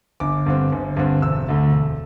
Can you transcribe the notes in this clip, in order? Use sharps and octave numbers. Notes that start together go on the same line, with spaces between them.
G1 D6
G2 D3 C4
G1
G2 D3 C4
E1 E6
D2 D3 A3
E1